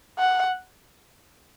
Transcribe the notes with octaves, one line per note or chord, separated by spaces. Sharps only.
F#5